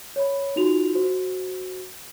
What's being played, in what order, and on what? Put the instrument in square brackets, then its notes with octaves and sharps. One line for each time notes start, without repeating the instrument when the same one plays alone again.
[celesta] C#5 B5
D#4 F4 F#4 F7
F#4 C5